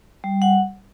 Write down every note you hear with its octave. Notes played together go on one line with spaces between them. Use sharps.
G3
F#5